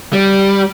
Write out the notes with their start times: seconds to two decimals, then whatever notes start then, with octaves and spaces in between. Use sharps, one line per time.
0.13 G3